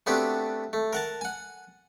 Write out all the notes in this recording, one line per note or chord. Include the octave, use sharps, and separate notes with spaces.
A3 B3 C4 D4 F#4 G4
A3
A#4 F#5 A5
F#5 G#5